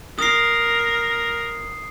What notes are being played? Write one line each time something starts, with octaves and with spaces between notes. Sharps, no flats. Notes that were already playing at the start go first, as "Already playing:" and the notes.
A#4 D#6 C7